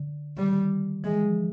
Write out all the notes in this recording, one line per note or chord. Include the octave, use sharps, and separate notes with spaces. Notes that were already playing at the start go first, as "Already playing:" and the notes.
Already playing: D3
D#3 G3
E3 G#3
F3